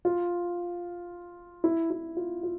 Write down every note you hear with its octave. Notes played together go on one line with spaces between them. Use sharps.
F4
E4
E4
F4
F4